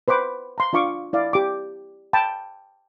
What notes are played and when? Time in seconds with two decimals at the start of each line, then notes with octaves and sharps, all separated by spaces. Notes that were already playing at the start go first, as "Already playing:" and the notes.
0.08 B4 C5 B5 D6
0.58 A#5 C6
0.73 D4 F4 F5 C#6 D6
1.13 E4 D5 F5
1.33 G4 D6
2.13 G5 A5 B5